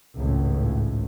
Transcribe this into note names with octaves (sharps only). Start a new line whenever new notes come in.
G#1 C#2 A2